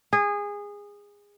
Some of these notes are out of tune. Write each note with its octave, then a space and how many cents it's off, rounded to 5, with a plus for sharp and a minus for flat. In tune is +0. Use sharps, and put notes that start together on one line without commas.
G#4 -20